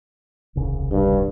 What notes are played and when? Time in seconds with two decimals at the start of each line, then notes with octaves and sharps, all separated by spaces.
0.55 D#1 C2 C#3
0.91 G2